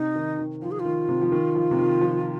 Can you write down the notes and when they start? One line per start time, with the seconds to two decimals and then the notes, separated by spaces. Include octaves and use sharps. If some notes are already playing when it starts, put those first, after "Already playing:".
Already playing: C3 D#4
0.16 D#3
0.38 D#3
0.61 F3 F4
0.71 G#4
0.79 F4
0.85 D#3
1.09 C3
1.22 F3
1.32 D#3
1.55 F3
1.71 C3
1.78 D#3
2.01 F3